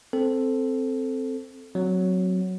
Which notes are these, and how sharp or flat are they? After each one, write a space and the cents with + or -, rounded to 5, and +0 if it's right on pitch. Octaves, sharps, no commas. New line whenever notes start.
C4 +0 A4 +0
F#3 +0 C4 +0